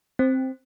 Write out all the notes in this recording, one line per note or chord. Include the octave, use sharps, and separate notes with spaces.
C4